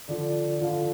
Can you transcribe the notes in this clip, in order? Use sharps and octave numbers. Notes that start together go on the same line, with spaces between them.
D3 F3 D5
D3 F3 F5